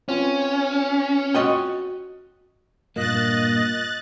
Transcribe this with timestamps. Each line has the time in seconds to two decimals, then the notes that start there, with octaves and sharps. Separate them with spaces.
0.09 C4 C#4 F4 B4
1.35 F#4 D#5 G5
2.96 G2 A#2 A#3 D#5 F#6 A6